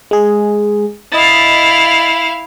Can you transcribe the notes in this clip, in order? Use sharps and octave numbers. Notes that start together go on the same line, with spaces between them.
G#3 G#4
E4 D#5 F5 A6